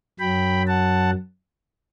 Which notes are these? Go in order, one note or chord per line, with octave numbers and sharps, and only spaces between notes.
F#2 F#3 G5 B5
F#5 A5